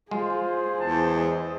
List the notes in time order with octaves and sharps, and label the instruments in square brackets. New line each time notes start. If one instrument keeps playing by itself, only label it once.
[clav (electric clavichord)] G#3 [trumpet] F4 [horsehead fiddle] G#4 C5
[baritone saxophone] E2 [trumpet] A5
[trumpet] D#5